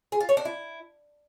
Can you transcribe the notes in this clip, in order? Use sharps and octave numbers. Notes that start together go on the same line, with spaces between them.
G#4
F4
C#5
D4
E4